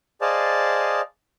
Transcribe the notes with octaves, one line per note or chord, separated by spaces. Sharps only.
G#4 C5 D5 D#5 F5 A5